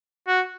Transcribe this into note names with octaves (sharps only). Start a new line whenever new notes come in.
F#4